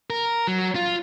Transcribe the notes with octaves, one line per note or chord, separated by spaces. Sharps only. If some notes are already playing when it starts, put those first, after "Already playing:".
A#4
F#3
F4